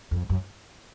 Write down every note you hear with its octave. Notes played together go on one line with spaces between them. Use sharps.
F2
F#2